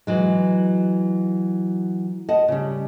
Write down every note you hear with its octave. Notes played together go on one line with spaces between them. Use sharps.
E3 F#3 G#3
D#5 F#5 A5
C#3 G3